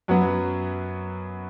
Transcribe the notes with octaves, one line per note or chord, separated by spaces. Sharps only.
F#2 F#3 B3